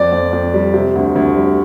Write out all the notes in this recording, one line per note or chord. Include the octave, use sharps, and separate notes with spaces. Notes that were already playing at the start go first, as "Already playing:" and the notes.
Already playing: F2 D5
F2
F2
G3
C3
D2
D2
G3